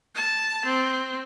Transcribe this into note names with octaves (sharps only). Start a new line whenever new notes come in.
A5
C4